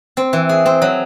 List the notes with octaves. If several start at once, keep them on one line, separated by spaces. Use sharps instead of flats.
C4
E3
G#4
C4
F#3